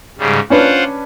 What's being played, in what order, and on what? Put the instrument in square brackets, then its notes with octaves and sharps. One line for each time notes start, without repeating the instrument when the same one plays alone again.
[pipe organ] G#2 C#3 G3
[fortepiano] C#4 D4 B4 [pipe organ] F4 C5 F#5